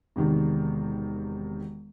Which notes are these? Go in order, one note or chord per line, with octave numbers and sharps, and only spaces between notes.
E1 C3 D#3